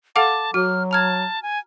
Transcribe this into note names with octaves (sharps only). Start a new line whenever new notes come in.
A4 F5 F#5 A5 D6
F#3 F#4 F6
A5 A#5 F6 G#6
G#5